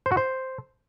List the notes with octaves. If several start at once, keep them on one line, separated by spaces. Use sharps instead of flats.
C5
F#4
C5